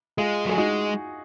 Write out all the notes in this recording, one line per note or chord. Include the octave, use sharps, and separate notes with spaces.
G#3 F4 G#4
F#3 G#4
G#3 D#4 F#4